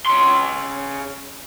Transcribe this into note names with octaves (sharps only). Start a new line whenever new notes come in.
C#3 C6